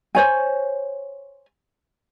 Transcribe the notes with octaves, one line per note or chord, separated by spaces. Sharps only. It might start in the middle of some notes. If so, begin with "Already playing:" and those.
C5 C#5 G#5